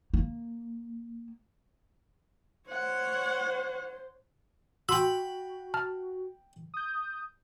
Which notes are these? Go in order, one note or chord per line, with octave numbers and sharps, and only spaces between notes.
A#3
C5 C#5 F#5
F#4 G5 B5 C6 E6
A5 F6
D#6 G6